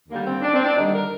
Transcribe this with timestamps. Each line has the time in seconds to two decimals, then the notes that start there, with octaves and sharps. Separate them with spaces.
0.08 D#2 D3 G3 A#3
0.25 C4
0.42 D4
0.54 C4
0.64 D4
0.75 D#2 D3 G3 D#4
0.93 A#4